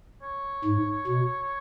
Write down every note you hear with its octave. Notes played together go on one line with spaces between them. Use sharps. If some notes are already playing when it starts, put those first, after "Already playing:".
C#5
G#2
B2